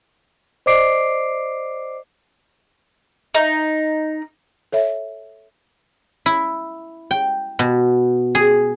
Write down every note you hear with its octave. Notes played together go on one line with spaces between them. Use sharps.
C5 D5 D#5 D6 C7 D7
D#4
A4 C#5 E5
E4
G5
B2
G#4